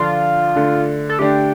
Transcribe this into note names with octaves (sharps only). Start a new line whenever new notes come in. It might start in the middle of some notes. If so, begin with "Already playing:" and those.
Already playing: D3 F3 D4 F4
D3 A3 D4
A4
D3 A3 D4 G4